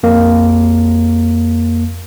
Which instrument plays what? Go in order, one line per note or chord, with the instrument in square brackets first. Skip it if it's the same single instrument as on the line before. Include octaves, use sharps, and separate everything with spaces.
[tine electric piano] F2 A#3